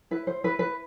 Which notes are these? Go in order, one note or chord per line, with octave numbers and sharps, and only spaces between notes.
E4 B4
C5
E4 B4
B4